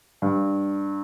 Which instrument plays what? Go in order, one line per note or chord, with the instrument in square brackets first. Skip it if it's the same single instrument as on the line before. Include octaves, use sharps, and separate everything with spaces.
[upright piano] G2